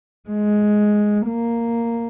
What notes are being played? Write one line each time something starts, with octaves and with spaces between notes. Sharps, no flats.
G#3
A#3